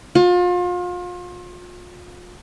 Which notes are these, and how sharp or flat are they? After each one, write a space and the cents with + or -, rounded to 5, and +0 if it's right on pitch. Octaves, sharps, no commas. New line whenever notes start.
F4 +35